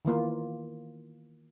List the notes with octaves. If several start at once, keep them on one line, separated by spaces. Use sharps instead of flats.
D#3 E3 A#3 F4